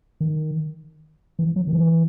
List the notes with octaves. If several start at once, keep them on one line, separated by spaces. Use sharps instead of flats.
D#3
E3
F#3
D#3
E3